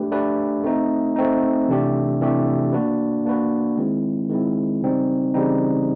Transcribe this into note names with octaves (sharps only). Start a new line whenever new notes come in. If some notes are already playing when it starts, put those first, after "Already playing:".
Already playing: A3 D4 G4 B4
A3 D4 G4 B4
A3 C4 D#4
A3 C4 D#4
C3 E3 A3 D4 G4
C3 E3 A3 D4 G4
A#3 D4 F#4 B4
A#3 D4 F#4 B4
D#3 G#3 C4 E4
D#3 G#3 C4 E4
C#3 E3 G3 C4 D#4
C#3 E3 G3 C4 D#4